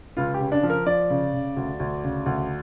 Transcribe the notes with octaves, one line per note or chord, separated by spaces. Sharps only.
C#2 F4
G4
C#3
D4
F3
A#4
F3 D5
C#3
C#3
D2
D2
C#3
D2